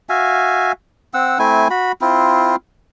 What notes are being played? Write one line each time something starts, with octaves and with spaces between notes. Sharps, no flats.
F#4 E5 F5 G#5
C4 F#5 E6
A3 C4 E4 G#5
F#4 B5
C4 E4 F4